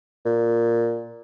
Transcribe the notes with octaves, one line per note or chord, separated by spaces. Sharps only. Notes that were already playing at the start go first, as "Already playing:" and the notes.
A#2